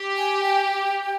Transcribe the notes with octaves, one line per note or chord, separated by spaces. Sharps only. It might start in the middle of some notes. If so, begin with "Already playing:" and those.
Already playing: G4
G#5
G5